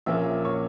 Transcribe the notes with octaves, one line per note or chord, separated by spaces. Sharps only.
A#1 A#2 A#3 C#4 E5 E6
C#5 C#6